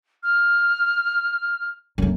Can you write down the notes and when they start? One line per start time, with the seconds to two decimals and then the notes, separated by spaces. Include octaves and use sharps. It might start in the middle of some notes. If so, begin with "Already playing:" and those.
0.23 F6
1.98 F#2 A#3